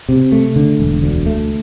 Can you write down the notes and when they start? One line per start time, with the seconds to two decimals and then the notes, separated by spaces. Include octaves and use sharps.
0.09 C3
0.32 A3
0.56 D3
0.80 E1
1.03 D2
1.26 A3